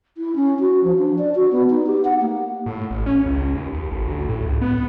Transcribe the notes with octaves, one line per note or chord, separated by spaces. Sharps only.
E4
C#4
F#4
F3
D4
D5
F#4
B3
D#4
G4
F#5
A#3
A2
A1
C#4
C#2
D#2
D#2
A1
D2
A2
C#2
B3